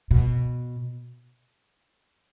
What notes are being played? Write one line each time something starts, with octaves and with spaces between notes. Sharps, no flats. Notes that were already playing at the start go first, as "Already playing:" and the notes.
B2